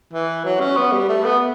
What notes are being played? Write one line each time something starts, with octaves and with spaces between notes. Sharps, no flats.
E3
F#3
C#4
B3
G3
A3
B3